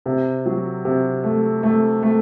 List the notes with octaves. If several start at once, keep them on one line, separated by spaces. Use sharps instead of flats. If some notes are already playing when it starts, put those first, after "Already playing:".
C3
F#3
C3
A3
A3
A3